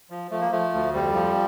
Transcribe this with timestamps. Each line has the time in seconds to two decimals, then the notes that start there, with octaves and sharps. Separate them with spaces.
0.10 F3
0.31 F3 A3
0.41 A#3
0.52 F3 A3
0.74 D2
0.93 F2 G3
1.15 F3